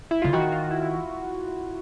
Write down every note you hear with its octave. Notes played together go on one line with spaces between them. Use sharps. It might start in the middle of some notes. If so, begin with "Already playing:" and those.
E4
D3 F4
D#3 F#4
F4
E4
E4